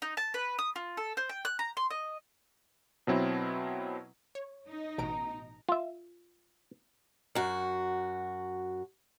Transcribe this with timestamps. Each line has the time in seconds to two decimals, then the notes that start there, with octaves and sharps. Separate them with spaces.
0.02 D#4
0.17 A5
0.34 B4
0.59 D#6
0.76 F4
0.97 A4
1.17 C5
1.29 G5
1.45 F#6
1.59 A#5
1.77 C6
1.90 D#5
3.07 B2 F#3 C4 E4
4.35 C#5
4.67 D#4
4.98 A1 B2 A#5 D7
5.69 F4 E5
7.35 F#2 F#4